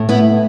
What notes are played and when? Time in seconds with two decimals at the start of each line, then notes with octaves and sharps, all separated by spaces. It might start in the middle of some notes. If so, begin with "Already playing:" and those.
Already playing: A2 A3
0.09 B3 E4